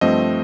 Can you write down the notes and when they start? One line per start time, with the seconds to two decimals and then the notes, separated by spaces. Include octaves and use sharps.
0.01 G2 F3 A3 C4 D#5